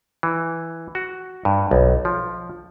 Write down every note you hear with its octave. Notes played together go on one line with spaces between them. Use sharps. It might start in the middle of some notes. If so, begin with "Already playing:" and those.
E3
F#4
G2
B1
F3